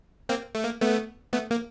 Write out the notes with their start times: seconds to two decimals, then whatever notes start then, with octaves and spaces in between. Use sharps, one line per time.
0.29 A#3 C4
0.55 A3
0.64 A#3
0.81 A3 B3
1.33 A3 B3
1.51 A#3